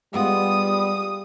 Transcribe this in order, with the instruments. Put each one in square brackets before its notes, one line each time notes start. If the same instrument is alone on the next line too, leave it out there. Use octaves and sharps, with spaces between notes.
[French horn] G3 [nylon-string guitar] G#3 B3 F4 [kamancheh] D#6